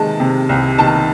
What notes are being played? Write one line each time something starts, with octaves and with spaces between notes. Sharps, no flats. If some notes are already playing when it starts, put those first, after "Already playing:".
Already playing: C3 D#3 G#3 A5
C3
C2
D#3 A5